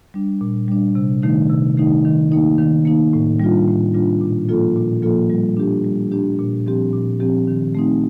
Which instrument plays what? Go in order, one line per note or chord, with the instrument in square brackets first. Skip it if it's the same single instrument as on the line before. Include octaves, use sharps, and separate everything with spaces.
[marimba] G3 D4
A#2
G3 D4
C3
D#3 A3 D#4
C3
D#3 A3 D#4
D#3
A#3 D#4
D#3
A#3 D#4
A2
G3 D4 F4
A2
G3 D4 F4
A#2
F3 A#3 F4 A4
A#2
F3 A#3 F4 A4
G3
D4 G4
G3
D4 G4
A#2
F3 C4 G4
A#2
F3 C4 G4
D#3
A3 C4 D#4